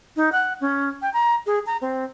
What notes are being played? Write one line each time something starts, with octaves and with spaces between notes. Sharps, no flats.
D#4
F#5
C#4
G5
A#5
G#4
A#5
C4